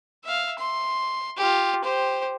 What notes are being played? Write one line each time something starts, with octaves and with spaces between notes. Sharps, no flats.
E5 F5
C6
F4 G4
G4 C5